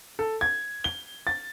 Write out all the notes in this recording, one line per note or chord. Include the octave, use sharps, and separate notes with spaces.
A4
G#6
G7
A6